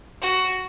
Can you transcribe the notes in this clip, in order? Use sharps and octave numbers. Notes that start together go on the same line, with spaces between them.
F#4